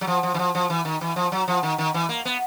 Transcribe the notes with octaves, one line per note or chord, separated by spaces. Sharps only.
F#3
F3
F3
E3
F3
F3
E3
D#3
E3
F3
F#3
F3
D#3
D#3
E3
A#3
B3